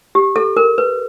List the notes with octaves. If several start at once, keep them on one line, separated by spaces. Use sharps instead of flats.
G4
A4
A#4
B4